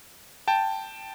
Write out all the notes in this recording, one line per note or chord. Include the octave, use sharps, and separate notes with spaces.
G5 A5